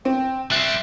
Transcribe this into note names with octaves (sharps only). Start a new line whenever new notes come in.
C4 G5
G3 C4 E5 F#6 C7 E7